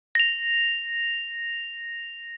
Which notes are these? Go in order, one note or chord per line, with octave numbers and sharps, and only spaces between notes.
A#6 F7